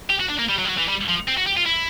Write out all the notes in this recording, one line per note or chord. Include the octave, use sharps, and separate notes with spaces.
G4
F#4
D4
A#3
G3
F#3
G3
F#3
E3
G3
F3
C4
F#4
G4
F4
E4